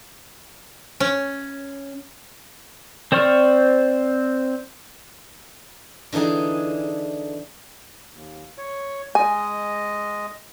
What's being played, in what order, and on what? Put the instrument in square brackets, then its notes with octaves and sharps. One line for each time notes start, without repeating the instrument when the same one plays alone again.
[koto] C#4
[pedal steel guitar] C4 C5 D5 C#6 F6
[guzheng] D3 E3 D4 D#4 G#4
[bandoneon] D#2
C#5
[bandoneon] G#3 D#5 [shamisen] G#5